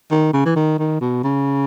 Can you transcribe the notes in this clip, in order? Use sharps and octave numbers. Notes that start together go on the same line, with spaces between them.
D#3
C#3
E3
D#3
D#3
B2
C#3